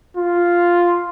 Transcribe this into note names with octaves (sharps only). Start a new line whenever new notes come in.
F4